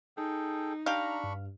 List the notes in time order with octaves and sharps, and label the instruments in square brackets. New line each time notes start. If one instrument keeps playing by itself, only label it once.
[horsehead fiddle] D#4 [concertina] G#4 A4 G5
[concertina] D4 B5 C#6 [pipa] G4 F5 [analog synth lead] A#5
[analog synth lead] G2